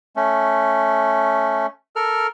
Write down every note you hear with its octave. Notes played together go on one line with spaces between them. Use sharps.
A3 C#4
A4 A#4 F6